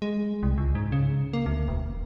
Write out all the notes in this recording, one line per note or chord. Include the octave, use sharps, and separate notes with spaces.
G#3
C2
C#2
G#2
C#3
A#3
D2
E1